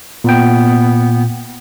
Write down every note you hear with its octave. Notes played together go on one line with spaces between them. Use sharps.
A#2 B3 G5